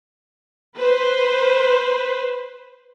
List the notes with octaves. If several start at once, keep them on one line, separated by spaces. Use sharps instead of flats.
B4 C5